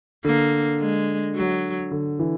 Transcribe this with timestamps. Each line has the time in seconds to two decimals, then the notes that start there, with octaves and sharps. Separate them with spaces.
0.25 D3 A#3
0.80 G#3
1.35 F#3
1.91 D3
2.19 E3